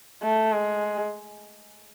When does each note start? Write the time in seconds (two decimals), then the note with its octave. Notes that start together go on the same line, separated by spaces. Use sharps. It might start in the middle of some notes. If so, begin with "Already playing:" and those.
0.23 A3
0.52 G#3